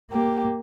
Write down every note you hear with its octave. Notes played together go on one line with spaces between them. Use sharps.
A#3 G4